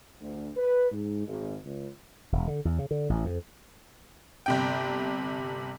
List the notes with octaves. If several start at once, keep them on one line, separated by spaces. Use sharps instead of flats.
D2
B4
G#2
G#1
C#2
E1
D3
E2
C#3
D3
A1
F2
G1 C3 G5